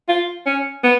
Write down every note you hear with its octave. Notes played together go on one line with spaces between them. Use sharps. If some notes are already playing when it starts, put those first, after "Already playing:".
F4
C#4
B3